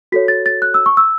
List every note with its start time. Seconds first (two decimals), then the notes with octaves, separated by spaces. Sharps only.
0.12 F#4 A4 C#5 B6
0.28 A6
0.46 A6
0.62 F#6
0.74 E6
0.86 C#6
0.97 E6